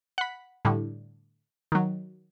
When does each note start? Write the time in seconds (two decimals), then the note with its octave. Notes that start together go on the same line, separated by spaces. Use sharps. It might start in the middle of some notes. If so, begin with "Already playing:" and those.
0.18 F#5 B5
0.65 A2 D3 G3
1.72 D#3 F#3